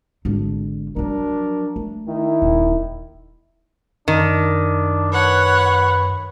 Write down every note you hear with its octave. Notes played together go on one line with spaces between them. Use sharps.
G#1 D3
F3 F#3 D4 F#4 A#4
A3
D#3 E4
D#1
F#2 D#3 D4
B4 C#5 F#5